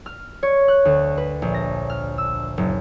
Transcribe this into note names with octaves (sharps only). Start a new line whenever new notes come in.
F6
C#5
F#6
D2
B4
A#1
A#6
F6
E6
F#1